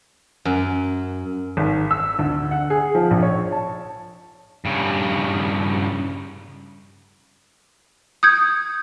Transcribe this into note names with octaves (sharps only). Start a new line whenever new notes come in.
F#2
G#1
E6
D2
F#5
G#4
F3
A#1
C#5
A5
G2 C#3
D#6 G6 G#6